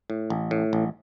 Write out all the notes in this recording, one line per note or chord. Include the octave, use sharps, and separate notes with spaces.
A2
A1
A2
A1